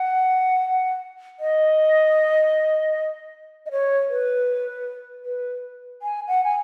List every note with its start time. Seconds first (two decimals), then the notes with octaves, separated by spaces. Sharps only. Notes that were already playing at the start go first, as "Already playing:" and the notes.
Already playing: F#5
1.40 D#5
3.66 D#5
3.71 C#5
4.10 B4
5.25 B4
6.02 G#5
6.28 F#5
6.44 G#5